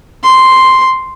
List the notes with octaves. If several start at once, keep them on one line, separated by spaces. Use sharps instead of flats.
C6